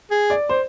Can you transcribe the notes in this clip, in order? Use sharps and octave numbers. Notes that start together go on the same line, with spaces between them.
G#4
D5
C5